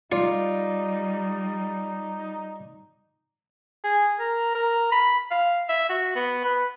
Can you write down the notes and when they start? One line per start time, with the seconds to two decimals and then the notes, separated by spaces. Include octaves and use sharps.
0.12 G3 D#4 F4 D5
3.84 G#4
4.20 A#4
4.55 A#4
4.92 B5
5.31 F5
5.69 E5
5.89 F#4
6.16 B3
6.45 B4